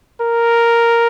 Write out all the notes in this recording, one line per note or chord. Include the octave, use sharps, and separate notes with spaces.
A#4